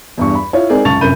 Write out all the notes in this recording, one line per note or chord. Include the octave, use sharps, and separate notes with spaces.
E2 G2 C#6
B5
E4 F4 C#5
G#3 C4 D#4 G#4 A#4 D5
C#2 F#2 A5 C#6 A6 F7
F1 F#2 A#4 B5 G6 D#7